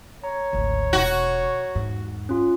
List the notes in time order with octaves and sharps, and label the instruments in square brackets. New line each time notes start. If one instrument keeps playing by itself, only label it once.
[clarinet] C#5 [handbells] A#5
[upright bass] G#1 D2
[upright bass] E1 [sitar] F#4
[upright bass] E2 G#2
[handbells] C#4 F4